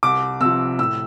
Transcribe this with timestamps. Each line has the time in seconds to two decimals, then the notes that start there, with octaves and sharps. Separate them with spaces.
0.03 C2 D6
0.41 C3 F3 E6
0.79 A2 E6